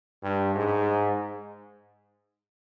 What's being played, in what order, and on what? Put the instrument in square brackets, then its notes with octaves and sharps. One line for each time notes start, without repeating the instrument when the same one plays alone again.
[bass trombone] G2
G#2